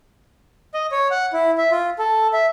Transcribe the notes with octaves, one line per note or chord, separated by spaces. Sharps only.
D#5
C#5
F#5
E4
E5
F4
A4
E5